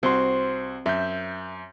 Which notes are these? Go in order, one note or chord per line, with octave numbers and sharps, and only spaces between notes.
C2 C4 F#4 C6
F#2 E5 G6